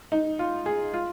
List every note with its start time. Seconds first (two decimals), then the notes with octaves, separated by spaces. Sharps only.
0.12 D#4
0.39 F4
0.66 G#4
0.93 F4